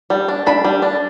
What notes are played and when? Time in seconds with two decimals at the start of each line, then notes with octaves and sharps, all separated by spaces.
0.10 G3
0.28 D4
0.47 D4 B5
0.65 G3
0.82 D4